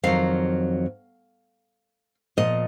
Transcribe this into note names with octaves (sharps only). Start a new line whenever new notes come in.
F2 D#3 F#3 F5
A#2 F3 D#5